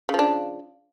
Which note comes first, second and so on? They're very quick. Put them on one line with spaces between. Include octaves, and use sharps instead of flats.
C#3 F3 D4